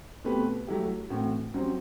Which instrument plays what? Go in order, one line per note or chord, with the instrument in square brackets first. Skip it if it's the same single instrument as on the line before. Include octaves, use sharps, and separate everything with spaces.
[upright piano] B2 A3 C4 G4 B4
F#3 A3 E4 G4
A2 E3 A3 C4 F#4
F#2 F#3 C4 G4 C5